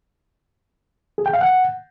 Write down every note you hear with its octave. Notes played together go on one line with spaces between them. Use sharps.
G#4
G5
F5
F#5